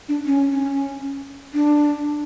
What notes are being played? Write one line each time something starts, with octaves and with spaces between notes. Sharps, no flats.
D4
C#4
C#4
D4